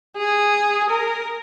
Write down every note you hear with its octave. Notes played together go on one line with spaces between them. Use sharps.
G#4
A#4